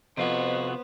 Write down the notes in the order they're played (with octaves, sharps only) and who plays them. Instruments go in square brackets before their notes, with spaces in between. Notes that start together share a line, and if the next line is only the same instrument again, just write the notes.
[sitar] F2 [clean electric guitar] C3 F4 F#4 [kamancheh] B3 C5